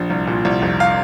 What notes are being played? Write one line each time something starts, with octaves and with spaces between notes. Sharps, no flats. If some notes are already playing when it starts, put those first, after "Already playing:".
Already playing: A#1
C2
A#2
C2
F1
F5